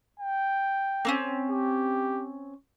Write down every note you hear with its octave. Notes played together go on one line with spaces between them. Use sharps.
G5
A#3 C4 C#4
G4